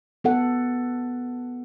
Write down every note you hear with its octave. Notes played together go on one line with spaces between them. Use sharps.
B3 A4 F#5